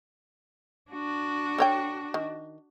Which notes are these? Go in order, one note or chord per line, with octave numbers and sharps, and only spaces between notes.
D4 F#4
A4 C#5 G5
D#3